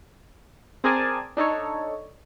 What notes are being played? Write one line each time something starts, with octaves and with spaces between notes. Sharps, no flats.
C4 G#4 A#4 D5 G#5 A5
D4 D#4 A4 C#5